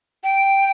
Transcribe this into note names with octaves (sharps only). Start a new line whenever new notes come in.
G5